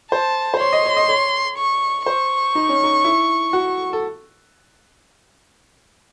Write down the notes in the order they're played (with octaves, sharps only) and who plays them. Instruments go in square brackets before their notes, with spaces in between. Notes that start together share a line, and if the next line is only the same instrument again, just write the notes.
[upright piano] C5 [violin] A5
[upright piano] C5
[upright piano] C#5 [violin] C6
[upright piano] D#5
C#5
D#5
C#5
[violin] C#6
[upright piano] C5 [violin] C#6
[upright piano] D#4
C#4
D#4
E4
F#4
A4